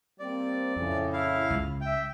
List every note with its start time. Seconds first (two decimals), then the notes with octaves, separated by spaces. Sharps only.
0.20 G3 A#3 C4 D5
0.76 F2 A2 C#3
1.13 E4 F5
1.50 C#2
1.81 E5 G5